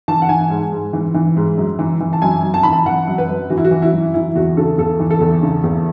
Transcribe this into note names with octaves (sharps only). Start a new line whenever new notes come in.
E3 A5
F#5
E3 G#5
G#2
G#2
E3
E3
G#2
F#2
E3
E3
A5
F#2 G#5
F#2
A5
E3 B5
A5
E3 F#5
F#2
B4
F#2
E3 F#4
E4
F#4
E3
E4
F#2
E3 E4
E2 F#4
C#3 A4
E2 A4
E3
A4
E2
C#3
E2